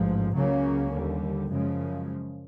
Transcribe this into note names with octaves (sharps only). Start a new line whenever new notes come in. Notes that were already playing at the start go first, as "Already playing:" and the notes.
Already playing: A1 G#2 F3
C#2 C#3 F#3 A#3 C#4
D#2 D3 G3
F#2 C#3 F3 G#3